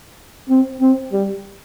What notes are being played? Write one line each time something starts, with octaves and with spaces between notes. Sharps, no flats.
C4
C4
G3